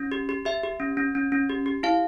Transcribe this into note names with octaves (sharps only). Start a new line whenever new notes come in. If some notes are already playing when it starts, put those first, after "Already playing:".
Already playing: C#4
G4
G4
G4 E5
G4
C#4
C#4
C#4
C#4
G4
G4
E4 F5